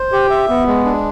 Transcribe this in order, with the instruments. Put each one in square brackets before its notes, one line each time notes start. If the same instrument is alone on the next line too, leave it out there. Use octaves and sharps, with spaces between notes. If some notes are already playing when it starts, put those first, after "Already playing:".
Already playing: [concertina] C5
G4
E5
B3
G#3
D4